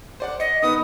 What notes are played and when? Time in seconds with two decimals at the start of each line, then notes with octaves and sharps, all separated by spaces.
0.20 C5 D5 F#5
0.40 D#5 C#7
0.62 D#3 B3 B4 D#6